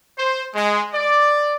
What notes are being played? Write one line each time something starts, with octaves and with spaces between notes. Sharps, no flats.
C5
G#3
D5